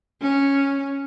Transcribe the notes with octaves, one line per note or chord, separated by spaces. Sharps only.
C#4